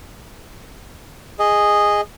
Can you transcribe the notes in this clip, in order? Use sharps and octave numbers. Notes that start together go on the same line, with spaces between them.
G#4 D#5